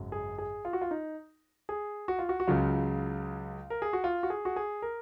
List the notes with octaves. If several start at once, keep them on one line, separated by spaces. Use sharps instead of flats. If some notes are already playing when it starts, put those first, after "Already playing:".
Already playing: G#1 F#2 C#3 F#3
G#4
G#4
F4
F#4
F4
D#4
G#4
F#4
F4
F#4
F#4
C#2 C#3 F#3 F4
A#4
G#4
F#4
F4
F#4
G#4
F#4
G#4
A#4